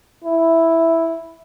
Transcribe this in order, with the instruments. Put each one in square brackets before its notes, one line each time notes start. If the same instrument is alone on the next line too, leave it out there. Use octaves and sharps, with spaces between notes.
[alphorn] E4